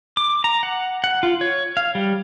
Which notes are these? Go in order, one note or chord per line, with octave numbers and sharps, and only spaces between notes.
D6
A#5
F#5
F#5
F4
C#5
F5
G3